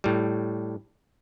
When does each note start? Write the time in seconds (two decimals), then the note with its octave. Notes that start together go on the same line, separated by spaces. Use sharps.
0.04 A2 G3